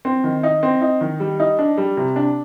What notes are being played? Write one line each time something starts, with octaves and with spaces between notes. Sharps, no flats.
C4
D#3
D#4
C4
D#4
D#3
G3
D#4
D4
G3
C3
D4